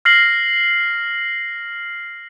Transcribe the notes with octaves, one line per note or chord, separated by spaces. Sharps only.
F6 A#6 C7 F#7